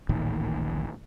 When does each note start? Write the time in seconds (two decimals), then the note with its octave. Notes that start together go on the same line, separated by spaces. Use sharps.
0.09 D1 A1 A#2 D#3